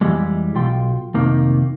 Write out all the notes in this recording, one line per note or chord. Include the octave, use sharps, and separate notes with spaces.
F2 E3 G3 G#3
B1 F4 G5 C6
F2 C3 D#3 A#3